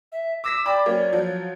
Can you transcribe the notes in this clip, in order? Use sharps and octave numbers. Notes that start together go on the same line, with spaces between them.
E5
D6 E6 A#6 B6
D5 G5 B5 D6
F#3 A#3 C#4
F3 F#3